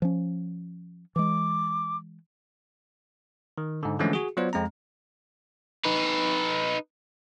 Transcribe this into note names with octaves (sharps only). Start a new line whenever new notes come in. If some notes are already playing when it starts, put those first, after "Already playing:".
F3 C#4
E3 G#3 D6
D#3
G#2 D3
D3 E3 F3 G#3 A3 C#4
F#4 G#4
F#3 B3 F4 C5 D5
F2 G#3 C4 A#5
D#4 B4